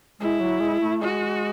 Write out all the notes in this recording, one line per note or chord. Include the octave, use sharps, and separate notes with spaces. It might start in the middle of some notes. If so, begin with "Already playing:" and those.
G#3 E4
F#3
G#3
A3
G#3 F#4